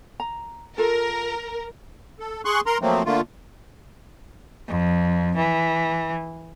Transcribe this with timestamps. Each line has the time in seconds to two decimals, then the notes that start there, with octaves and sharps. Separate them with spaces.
0.20 A#5
0.78 F4 A4 A#4
2.19 A4
2.45 G#4 C6 C#6 F#6
2.66 A#4 A#5 C6
2.82 F3 F#3 A3 A#3 C4
3.06 D3 A3 A#3 F4
4.68 F2
5.36 E3